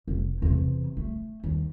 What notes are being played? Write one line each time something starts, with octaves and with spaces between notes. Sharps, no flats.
F1
E2 C3
A3
D#2